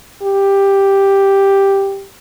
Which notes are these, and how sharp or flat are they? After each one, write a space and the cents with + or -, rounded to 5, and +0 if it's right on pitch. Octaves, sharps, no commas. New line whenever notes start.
G4 +5